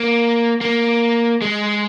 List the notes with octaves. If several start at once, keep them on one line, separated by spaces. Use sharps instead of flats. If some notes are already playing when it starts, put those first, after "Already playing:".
Already playing: A#3
A#3
G#3